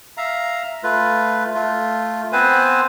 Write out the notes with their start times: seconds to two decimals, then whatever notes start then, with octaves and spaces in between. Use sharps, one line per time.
0.17 E5 F5 A#5
0.83 A3 F4 B4
1.55 A3 F4
2.32 B3 C4 B4 C5 G#5